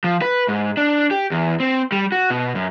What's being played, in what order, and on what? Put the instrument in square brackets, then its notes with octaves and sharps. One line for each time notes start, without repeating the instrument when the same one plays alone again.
[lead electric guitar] F3
B4
G#2
D4
G4
E2
C4
G3
F#4
B2
F#2